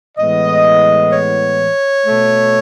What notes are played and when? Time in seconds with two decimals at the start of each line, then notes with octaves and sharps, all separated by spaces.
0.16 A2 E3 G#3 B3 D#5
1.11 C#5
2.06 B2 A3